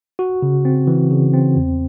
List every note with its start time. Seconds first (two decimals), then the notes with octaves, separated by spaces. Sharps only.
0.19 F#4
0.42 C#3
0.65 C4
0.87 E3
1.11 C#3
1.34 C4
1.57 E2